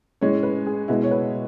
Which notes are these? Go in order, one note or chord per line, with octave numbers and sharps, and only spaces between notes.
A2 G#3 C#4 C#5
B4
G#4
B2 G#3 B3 E4
C#5
B4